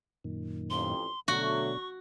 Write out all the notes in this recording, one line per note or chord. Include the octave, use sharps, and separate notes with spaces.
F#2 A#2 D#3
A1 F2 C6
B2 D3 F#3 A3 D4 F#4 C#6